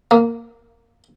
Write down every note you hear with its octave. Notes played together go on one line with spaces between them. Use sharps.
A#3